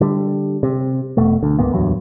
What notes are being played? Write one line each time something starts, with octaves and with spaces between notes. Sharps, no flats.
D3 G3
C3
E1 B2 A3
D2 D3
C#2 G#2 A#3 B3
D1 E2 G2 F#3